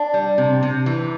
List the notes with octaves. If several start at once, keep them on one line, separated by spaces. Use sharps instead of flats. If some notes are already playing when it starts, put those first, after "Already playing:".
Already playing: D4
G3
C3
C3
E3